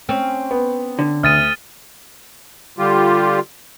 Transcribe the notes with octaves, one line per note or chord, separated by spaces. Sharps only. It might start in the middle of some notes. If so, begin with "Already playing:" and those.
C4 C#4
B3
D3
D2 D#6 F6 A6 D#7
D3 G3 F4 G4